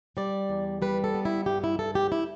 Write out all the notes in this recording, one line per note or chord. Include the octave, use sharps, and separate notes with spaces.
G3 D5
E2
G3 B4
A4
B3
E4
G2 G4
E4
G2 A4
G4
E4